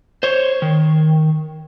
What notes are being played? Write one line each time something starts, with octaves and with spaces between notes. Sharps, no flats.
C5 C#5
D#3